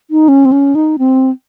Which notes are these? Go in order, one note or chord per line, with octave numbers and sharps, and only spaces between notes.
D#4
C#4
C4
C#4
D#4
C4